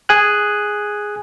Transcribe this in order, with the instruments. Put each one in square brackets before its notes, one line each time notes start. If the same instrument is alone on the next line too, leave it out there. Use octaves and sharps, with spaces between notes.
[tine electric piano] G#4 G#5 F#6